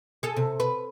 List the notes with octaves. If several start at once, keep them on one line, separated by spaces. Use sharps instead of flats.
G#4 A4
C3
B4